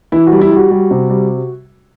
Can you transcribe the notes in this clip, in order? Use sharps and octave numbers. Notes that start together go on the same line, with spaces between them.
E3 E4
G3 F#4
E4
G3 F#4
G3
C3
G3